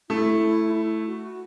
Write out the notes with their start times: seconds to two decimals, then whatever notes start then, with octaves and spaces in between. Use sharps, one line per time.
0.09 A3 E4
0.75 E4
1.07 F#4